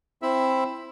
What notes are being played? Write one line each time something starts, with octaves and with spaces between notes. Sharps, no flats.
C4 E4 E5